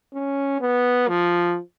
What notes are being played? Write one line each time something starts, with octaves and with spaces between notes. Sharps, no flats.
C#4
B3
F3